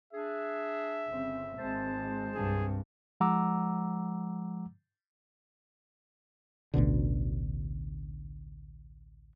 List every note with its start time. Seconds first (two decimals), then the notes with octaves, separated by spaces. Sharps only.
0.13 D4 G#4 E5
1.07 G1 C#3 C4
1.58 G#1 G#3 C4 C5 A5
2.35 C2 G2 G#4
3.20 F3 G#3 F#5 A#5 D6 E6
6.74 A1 D2 B2 D3